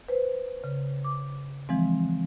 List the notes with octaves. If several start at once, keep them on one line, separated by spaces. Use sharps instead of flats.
B4 C5
C#3
D6
E3 F3 G#3 C4